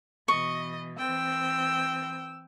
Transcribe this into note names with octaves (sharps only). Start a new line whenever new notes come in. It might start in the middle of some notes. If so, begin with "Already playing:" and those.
B2 E3 D#5 C#6
E3 C4 G5 E6